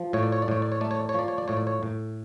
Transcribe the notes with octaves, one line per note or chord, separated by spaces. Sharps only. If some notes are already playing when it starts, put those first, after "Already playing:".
Already playing: F3
A2 C#5
D5
C#5
D5
A2 C#5
D5
C#5
A3 D5
C#5
D5
C#5
F3 D5
C#5
D5
A2 C#5
D5
C#5
A2